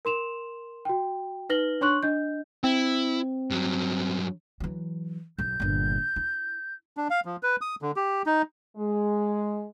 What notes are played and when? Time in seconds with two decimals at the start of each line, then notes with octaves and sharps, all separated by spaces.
0.05 A#4 C6 E7 F7
0.85 F#4 G5
1.49 D#4 B4 F6 A#6 F#7 G7
1.81 D4 C#5 C6 C#6 F#6 F#7
2.03 D4 D#5 G6
2.64 C4 E4
3.51 G2 F#3
4.60 E3 F#3
5.39 B1 F#2 G6
5.60 G1 A#2
6.16 E4
6.97 D4
7.10 F5
7.25 F3
7.43 B4
7.61 D#6
7.82 D3
7.96 G4
8.26 D#4
8.77 G#3